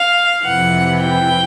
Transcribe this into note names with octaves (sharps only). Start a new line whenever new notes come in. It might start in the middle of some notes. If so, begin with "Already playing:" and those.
Already playing: F5
F2 C3 E3 F#5
G5